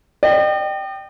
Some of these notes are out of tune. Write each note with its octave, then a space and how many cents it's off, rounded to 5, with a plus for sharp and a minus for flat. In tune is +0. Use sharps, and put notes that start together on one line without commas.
D#5 -45 G5 -10